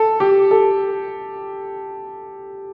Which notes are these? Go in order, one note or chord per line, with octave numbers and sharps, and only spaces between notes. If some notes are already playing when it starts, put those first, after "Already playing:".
Already playing: A4
G4
A4